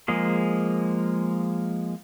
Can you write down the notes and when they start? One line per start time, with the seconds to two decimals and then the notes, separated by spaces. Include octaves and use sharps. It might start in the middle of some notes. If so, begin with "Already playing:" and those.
0.08 F3 G#3 A#3 G#4